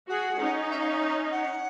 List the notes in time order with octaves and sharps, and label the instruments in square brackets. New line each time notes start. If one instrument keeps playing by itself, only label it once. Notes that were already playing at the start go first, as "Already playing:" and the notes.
[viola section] F#4 G#4 [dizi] F#5
[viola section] C#4 D#4
[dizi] E5
F5
E5
F#5